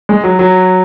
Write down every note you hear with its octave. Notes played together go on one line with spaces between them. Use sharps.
G#3
F#3
F#3